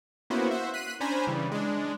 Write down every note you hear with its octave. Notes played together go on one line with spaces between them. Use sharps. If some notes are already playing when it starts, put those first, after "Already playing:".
A#3 B3 C#4 E4 F#4 C5
F#4 C5 E5
F#6 B6 C7 D#7
C#4 D4 C5 G#5 A#5 B5
C#3 E3 G3
G#3 D4